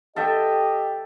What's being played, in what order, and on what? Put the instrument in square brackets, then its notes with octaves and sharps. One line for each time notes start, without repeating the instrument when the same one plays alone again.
[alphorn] G4 [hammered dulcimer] A4 E5 G5 [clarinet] D#5